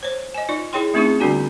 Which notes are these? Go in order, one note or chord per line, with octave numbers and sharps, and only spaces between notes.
C5 C#5
D#5 G#5
D#4 F4 D5
E4 G#4 C#5 G5 C6
A3 C4 C#4 D#4 F4 G#4
D3 G3 B3 D4 F#4 G#5